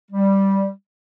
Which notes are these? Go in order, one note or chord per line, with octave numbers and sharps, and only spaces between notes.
G3